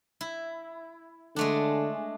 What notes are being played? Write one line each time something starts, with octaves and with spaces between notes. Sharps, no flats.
E4
D3 G#3 A3 D4